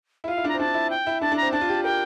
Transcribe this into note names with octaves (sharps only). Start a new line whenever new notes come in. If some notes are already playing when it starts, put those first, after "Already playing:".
E4
F4 F5
E4
D4 A#5
C4
D4 A5
E4
G5
E4
D4 A5
D4
C4 A#5
D4 A5
F4
G4
A#4 G5